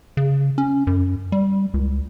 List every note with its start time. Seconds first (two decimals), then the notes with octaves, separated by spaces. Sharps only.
0.17 C#3
0.58 C#4
0.87 F#2
1.32 G3
1.74 C#2